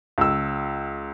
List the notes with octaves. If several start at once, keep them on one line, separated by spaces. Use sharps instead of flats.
C#2 E6